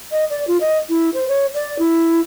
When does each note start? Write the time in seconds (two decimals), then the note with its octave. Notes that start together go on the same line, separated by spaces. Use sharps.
0.12 D#5
0.30 D5
0.47 F4
0.61 D#5
0.89 E4
1.14 C5
1.28 C#5
1.54 D5
1.79 E4